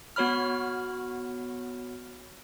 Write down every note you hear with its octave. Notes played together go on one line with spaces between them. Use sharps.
B3 F#4 C#5 B5 F6